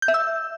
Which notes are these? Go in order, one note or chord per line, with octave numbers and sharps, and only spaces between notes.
G6
E5
E6